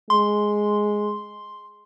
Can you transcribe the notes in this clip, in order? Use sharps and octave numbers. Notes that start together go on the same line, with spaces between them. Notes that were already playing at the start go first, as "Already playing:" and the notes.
G#3 C6